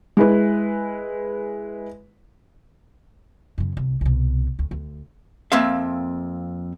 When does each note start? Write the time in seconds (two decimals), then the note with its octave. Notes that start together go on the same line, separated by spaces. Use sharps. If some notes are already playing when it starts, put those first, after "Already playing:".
0.17 G#3 E4 B4
3.58 F#2 C#3
3.77 C2
4.01 C2 B2
4.59 D2
4.71 D2
5.52 F2 A#3 C4 E5 F5